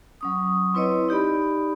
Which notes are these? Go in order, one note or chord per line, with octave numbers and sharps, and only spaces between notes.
F#3 C#4 D#6
C4 E4 B4 C#5 D#5
D#4 G4 D5 B5